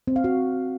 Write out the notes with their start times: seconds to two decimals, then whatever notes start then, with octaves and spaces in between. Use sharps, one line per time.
0.07 C4
0.16 F5
0.24 F#4